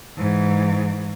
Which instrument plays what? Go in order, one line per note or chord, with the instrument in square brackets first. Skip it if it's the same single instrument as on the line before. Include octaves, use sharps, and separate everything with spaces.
[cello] G#2 E3